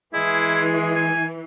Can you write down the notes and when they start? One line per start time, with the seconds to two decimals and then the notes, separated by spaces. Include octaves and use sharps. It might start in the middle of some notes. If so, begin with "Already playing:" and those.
0.14 E3 G#3 E4 G#4
0.95 G#5